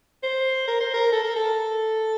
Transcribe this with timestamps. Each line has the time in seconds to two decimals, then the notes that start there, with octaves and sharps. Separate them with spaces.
0.23 C5
0.68 A#4
0.81 C5
0.94 A#4
1.12 A4
1.24 A#4
1.36 A4